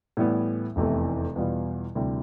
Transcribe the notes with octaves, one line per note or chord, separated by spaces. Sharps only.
A2 E3 G3 B3
F1 E2 C3 E3 A3
E2 B2 G3 B3 F4
D2 C3 E3 G3